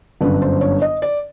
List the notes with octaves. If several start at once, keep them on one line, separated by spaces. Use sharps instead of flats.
G1 F#2 D3 B4
C5
C#5
D#5
D5